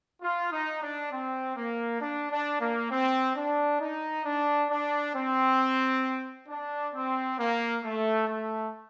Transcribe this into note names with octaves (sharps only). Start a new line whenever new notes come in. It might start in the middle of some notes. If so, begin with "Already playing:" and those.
F4
D#4
D4
C4
A#3
D4
D4
A#3
C4
D4
D#4
D4
D4
C4
D4
C4
A#3
A3
A3